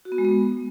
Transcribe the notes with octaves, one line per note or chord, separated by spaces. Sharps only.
F#4
B3
G#3
B3